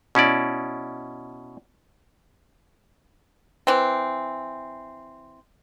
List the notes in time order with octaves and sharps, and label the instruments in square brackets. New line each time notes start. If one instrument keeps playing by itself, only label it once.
[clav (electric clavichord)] B2 C#4 E4 D5
[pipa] E3 C4